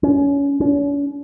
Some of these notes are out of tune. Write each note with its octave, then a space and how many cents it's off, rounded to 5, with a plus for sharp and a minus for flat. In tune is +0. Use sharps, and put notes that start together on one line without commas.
C#4 +25
C#4 +45